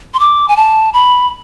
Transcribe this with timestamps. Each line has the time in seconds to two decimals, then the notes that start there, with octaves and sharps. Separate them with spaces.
0.14 C6
0.20 D6
0.48 G#5
0.56 A5
0.93 B5